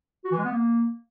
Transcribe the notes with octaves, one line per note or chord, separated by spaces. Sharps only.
F#4
E3
G#3
B3
A#3